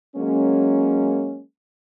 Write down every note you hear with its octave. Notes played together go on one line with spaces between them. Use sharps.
F#3 G#3 A#3 C#4